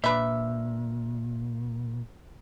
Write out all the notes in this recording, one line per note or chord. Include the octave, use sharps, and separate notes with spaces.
A#2 D4 B4 E5